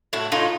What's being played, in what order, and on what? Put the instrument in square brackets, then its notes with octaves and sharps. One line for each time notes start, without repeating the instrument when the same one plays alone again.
[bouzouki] A2 E4 F#4
A2 D#4 F4